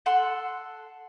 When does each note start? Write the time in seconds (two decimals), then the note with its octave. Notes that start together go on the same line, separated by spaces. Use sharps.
0.06 A4 F#5 C6